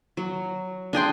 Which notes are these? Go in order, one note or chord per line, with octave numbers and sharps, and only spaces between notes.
F#3
D4 G#4 G5 C6